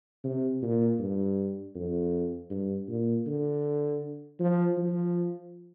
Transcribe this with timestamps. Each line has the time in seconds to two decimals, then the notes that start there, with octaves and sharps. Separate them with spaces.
0.24 C3
0.62 A#2
0.99 G2
1.75 F2
2.50 G2
2.88 A#2
3.26 D3
4.40 F3
4.77 F3